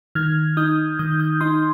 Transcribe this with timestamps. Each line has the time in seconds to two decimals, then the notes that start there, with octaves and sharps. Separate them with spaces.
0.15 D#3 F6 G#6
0.57 D#4 D#6 G6
0.99 D#3 D#6 G6
1.19 D#6 G6
1.41 D#4 C6 D#6